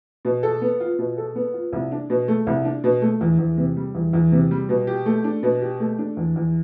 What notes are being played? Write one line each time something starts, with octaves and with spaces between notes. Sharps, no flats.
B2
A4
B3
F4
B2
A4
B3
F4
C2
D4
B2
A3
C2
D4
B2
A3
E2
E2
C3
G3
E2
E2
C3
G3
B2
G4
A3
D4
B2
G4
A3
D4
E2
E2